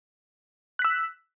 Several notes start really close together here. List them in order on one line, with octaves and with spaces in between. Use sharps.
F#6 B6 E6